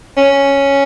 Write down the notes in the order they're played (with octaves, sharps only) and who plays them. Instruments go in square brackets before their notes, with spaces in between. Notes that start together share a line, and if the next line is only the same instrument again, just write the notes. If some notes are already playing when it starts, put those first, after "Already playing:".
[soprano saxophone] C#4